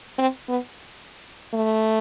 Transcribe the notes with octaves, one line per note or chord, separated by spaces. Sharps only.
C4
B3
A3